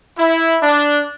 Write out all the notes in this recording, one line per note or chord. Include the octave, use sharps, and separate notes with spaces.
E4
D4